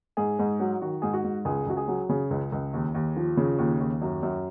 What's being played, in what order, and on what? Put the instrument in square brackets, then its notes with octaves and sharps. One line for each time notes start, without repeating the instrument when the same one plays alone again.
[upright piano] G#2 G#4
G#2
F#3
D#3 F#4
G#2 G#4
F#4
G#2
C#2 G#4
C#2 F#4
G#4
F#3
C#3 G#4
C#2
C#2
D#2
D#2
F3
C#3
D#2
D#2
F#2
F#2